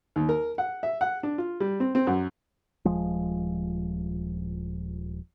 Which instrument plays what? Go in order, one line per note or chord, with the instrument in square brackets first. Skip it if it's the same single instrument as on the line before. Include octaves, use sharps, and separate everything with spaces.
[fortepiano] D#2
A#4
F#5
E5
F#5
D4
F4
G3
C4
C4
F#2
[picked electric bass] D#1 F3 G#3